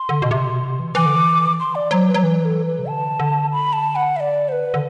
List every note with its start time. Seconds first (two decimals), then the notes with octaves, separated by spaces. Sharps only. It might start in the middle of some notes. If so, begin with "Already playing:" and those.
Already playing: C6
0.09 D3
0.22 B2
0.31 C3
0.47 B2
0.62 C3
0.80 E3
0.95 E3 D6
1.06 D3
1.16 E3
1.60 C6
1.75 D5
1.91 F#3 C5
2.08 B4
2.14 F#3
2.23 E3 B4
2.45 A4
2.66 B4
2.79 C3
2.88 D3 A5
3.20 D3
3.52 B5
3.73 A5
3.96 F#5
4.16 E5
4.20 D5
4.49 C5
4.52 B4
4.74 D3